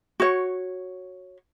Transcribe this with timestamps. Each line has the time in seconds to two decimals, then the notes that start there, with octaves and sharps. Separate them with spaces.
0.20 F#4 C#5